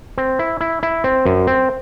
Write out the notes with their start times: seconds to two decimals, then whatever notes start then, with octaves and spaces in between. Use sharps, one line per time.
0.18 C4
0.39 E4
0.61 E4
0.83 E4
1.04 C4
1.26 F#2
1.47 C4